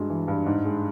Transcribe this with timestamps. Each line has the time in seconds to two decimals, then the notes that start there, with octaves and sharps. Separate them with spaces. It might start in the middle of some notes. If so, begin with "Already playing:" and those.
Already playing: G2 G#3 F#4
0.10 E3
0.28 G2
0.46 G#2
0.65 G#3